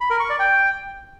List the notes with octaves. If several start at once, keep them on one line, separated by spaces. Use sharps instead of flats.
B5
A#4
C#6
D5
G5